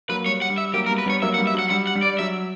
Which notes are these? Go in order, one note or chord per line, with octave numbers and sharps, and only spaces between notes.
F#3 A#3 B4
G3 C#5
F#5
G3
E5
F#3 A#3 G4
A#4
G3 B3
B4
G3 B3 C#5
F#3 A#3 E5
F#5
G3
E5
F#3 F#5
G3 F#5
F#5
G3
D5
F#3 E5